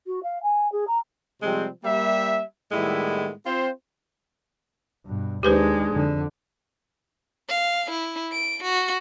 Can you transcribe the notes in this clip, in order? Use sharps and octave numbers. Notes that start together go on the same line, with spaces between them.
F#4
F5
G#5
G#4
A#5
C3 F3 G3 G#3 C4
G3 A#3 E5
A2 D#3 G3 G#3 B3 E4
C4 F4 C5
G2 B2
D#2 G#3 D4 D#4 G4 B4 C5
F2 D3
F5
E4
D7
F#4